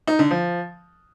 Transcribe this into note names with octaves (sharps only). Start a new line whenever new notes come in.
D#4
D3
F3